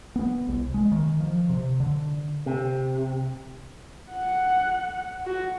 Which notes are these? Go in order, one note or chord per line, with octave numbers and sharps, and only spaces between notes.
B3
C2
G#3
D#3
F3
C3
D3
C3
F#5
F#4